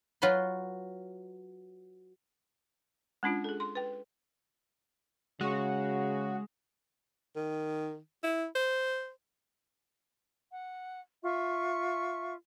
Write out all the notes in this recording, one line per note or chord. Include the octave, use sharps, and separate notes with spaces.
F#3 F4 B4 B5 C6
G#3 C#4 D4 F4
G#4 A4
C6
B4 G5
C#3 G#3 F#4
D#3
E4
C5
F#5
F4 E5 C#6